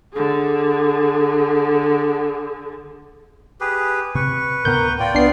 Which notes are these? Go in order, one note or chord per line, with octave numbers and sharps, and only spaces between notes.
D3 G#4
G4 G#4 B4
C3 B4 C#6
D2 A2 B3 A#4 G6
F4 A#4 D5 G5
C2 B3 D4 C7